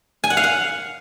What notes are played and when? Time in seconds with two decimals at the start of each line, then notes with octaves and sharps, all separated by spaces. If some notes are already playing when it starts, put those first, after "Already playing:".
0.24 G#5
0.30 F#5
0.37 F5
0.44 F#5